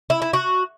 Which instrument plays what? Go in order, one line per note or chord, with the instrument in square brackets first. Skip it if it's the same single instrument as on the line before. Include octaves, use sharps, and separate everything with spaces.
[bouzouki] E4
E4
F#4